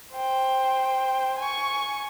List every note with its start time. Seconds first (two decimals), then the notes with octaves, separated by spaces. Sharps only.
0.13 C5 G5
1.39 G#5 C#6